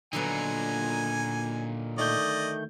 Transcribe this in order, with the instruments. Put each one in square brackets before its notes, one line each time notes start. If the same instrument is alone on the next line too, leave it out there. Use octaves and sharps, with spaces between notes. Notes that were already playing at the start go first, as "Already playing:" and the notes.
[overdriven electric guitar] A#2 D#4 [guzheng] D3 F#3 B3 [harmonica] G#5
[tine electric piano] D#3 A3 G6 [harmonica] D5 D#5